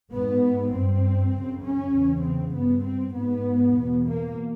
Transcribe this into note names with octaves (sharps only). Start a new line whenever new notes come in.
G#2 B3
G2 C4
F#2 C#3
C#4
E2 C#3
C4
G2 B3
C4
G#2 B3
E2 B2
A#3